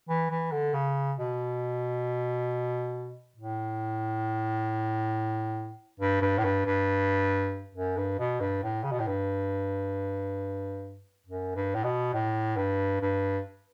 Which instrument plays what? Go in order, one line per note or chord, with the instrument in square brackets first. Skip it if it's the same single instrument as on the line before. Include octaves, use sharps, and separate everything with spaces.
[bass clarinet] E3
E3
D3
C#3
B2
A2
G2
G2
A2
G2
G2
F#2
G2
B2
G2
A2
C#3
B2
A2
G2
F#2
G2
A2
B2
A2
G2
G2